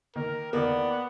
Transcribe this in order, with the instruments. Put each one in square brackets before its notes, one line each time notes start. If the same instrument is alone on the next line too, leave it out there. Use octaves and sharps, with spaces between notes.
[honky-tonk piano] D#3 A#3 [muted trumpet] A#4
[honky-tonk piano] E2 D#3 [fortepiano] A#3 [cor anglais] B3 [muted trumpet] D5